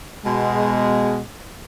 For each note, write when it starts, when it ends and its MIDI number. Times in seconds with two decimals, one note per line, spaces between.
0.25 1.19 47
0.25 1.19 56